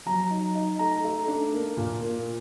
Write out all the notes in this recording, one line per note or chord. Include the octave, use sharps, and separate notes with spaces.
F#3 A#5
D#4
D#4
A3 A#5
A3
D4
A#3
A#2
A#3